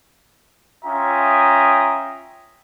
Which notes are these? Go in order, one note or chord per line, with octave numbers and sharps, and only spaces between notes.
C#4 F4 E5 G5 A#5 D#6